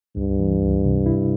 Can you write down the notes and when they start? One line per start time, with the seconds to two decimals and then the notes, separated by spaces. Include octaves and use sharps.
0.16 C#2 G2
0.39 E3
0.61 C#2
0.85 C3
1.06 E4